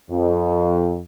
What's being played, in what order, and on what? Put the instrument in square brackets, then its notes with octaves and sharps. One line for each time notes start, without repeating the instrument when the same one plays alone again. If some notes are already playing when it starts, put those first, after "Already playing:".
[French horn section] F2